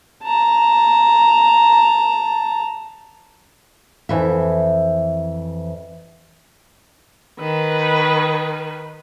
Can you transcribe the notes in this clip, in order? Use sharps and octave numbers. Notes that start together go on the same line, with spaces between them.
A5 A#5
F2 E3 E5
D#3 B4